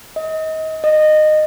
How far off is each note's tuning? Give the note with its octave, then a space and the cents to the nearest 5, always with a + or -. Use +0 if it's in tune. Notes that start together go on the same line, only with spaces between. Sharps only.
D#5 +30
D#5 -20